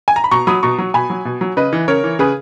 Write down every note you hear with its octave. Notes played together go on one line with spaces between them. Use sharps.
G#5
A#5
B5
B2 A#5 C#6
F#3 B5 D#6
B2 A#5 C#6
F#3
B2 G#5 B5
F#3
B2
F#3
C#3 B4 D#5
E3
C#3 A#4 C#5
E3
C#3 G#4 B4